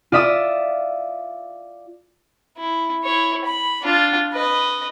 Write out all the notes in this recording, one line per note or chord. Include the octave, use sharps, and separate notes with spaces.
F4 D5 E5 D#6 E6
E4
E4 C#5
B5
D4 F4
B4 D#5